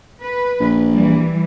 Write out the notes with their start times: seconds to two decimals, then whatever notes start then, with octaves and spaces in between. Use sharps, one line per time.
0.23 B4
0.60 A#1
0.90 E3 G3